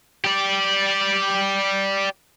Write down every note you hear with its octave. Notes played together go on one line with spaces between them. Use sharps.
G4 D5